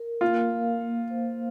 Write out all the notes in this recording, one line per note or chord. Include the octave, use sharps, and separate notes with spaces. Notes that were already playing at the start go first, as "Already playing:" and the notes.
Already playing: A#4
A#3 F4
F5
A#3
C5